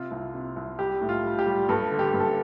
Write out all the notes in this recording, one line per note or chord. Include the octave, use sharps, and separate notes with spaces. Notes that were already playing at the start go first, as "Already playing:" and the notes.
Already playing: C3 F4
C2
C3
C2
G3 G4
A2
F4
G3
G4
G3
G2 A4
D3
G4
G2
A4